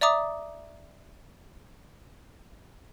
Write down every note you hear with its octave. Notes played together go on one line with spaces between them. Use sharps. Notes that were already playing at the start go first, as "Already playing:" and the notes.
D5 E5 A#5 D6 D#6